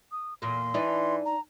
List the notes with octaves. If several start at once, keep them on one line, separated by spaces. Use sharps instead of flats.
D#6
E2 A#2 A#3 C6
E3 D4 D#4
A#5